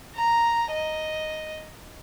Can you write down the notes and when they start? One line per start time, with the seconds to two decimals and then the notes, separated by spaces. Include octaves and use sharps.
0.15 A#5
0.71 D#5